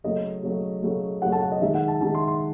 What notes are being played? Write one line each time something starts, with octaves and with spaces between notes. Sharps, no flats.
C#3 F#3 A3 D#5
C#3 F#3 A3
C#3 F#3 A3
C#3 F#3 A3 F#5
A5
F#5
D#5
D#3 G#3 E5
F#5
A5
D#3 G#3 A5
C6
C6